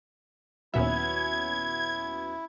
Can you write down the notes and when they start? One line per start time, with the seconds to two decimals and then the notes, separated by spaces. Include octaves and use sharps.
0.74 D#2 A#2 F#3 B3 C#4 E4 E5 G#6